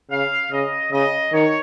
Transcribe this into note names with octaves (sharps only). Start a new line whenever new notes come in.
C#3 F5
C#3 D#5
C#3 D#5
D#3 C#5